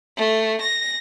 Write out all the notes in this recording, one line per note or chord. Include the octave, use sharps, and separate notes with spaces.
A3
A#6